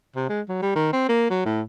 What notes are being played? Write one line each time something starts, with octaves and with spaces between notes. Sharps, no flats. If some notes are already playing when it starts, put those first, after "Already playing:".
C3
G#3
F#3
G3
D#3
C4
A#3
F#3
A2